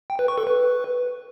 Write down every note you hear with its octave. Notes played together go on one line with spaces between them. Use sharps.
G5
B4
C#6
A4
B4